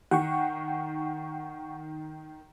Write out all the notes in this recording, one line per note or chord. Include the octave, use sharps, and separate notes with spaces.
D#3 F#5 G5 C#6